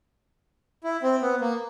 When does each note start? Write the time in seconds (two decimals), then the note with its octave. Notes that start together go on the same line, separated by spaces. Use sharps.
0.84 E4
1.02 C4
1.22 B3
1.41 A#3